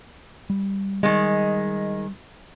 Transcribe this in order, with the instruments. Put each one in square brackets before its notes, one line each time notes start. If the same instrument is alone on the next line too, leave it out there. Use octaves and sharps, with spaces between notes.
[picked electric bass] G3
[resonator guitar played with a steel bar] D#3 G#3 [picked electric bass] G3